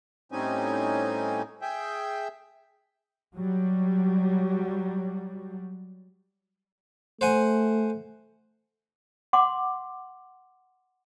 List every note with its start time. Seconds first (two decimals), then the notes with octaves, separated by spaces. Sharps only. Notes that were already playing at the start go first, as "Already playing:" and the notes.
0.32 A2 G3 C4 C#4 D#4 G#5
1.62 G#4 E5 G5
3.36 F#3 G3
7.21 A3 C5 F#5 G#5
9.33 F#5 C6 D6